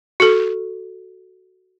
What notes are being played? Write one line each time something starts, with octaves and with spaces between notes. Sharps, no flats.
F#4 A4